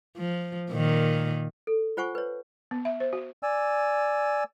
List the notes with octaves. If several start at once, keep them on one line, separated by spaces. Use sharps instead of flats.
F3
A#2 D#3
A4
F4 C5 F#5 G#5 C#6
B4 C#5
B3
E5
C5
F#4
D5 G#5 E6